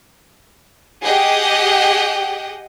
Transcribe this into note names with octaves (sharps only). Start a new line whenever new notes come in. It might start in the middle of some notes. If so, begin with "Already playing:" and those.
G4 G#4 D#5 F#5 G5 D#6